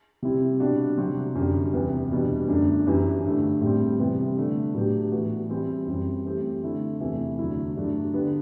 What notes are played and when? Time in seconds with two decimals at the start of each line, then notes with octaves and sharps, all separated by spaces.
0.23 C3 G3 C4 E4 G4
0.60 B2 G3 D4 F#4
0.97 C3 F#3 C4 F#4
1.35 F#2 D3 G3
1.73 E2 C3 E3 B3
2.11 E2 B2 G3 D4
2.48 F#2 D3 A3 D4
2.86 F#2 E3 B3 E4 G4
3.24 G2 D3 A3
3.61 A2 G3 C4
3.99 C3 E3 G3 B3
4.37 D3 A3 D4
4.74 A2 F#3 B3 D4 G4
5.12 A2 E3 B3 F#4
5.49 E3 G3 C4 E4
5.87 F#2 E3 G3 C4
6.25 E3 A3 C4 G4
6.63 D3 A3 E4
7.00 E2 C3 E3 A3 E4
7.39 E2 D3 F#3 A3 E4
7.76 G2 F#3 A3 D4
8.14 D3 G3 B3